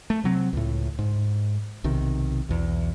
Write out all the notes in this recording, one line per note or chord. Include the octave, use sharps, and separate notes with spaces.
A3
C3 F#3 C4
C#2 A2
G#2
B1 C3 D#3
B1 E2